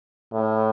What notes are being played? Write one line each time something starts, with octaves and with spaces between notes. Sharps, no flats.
A2